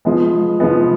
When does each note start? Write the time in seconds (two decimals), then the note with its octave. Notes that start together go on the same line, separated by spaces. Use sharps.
0.05 F3 G#3 B3
0.60 F3 G#3 B3